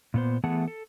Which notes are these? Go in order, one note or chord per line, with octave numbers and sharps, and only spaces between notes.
A#2 B3 C5
E3 A3 B3 G#4 F#5 A5
A4